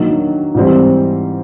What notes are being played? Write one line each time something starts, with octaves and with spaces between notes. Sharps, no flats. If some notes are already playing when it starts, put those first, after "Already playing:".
Already playing: D#3 F#3 A#3 D4
G#2 E3 G3 C4